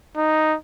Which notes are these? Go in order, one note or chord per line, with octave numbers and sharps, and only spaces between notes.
D#4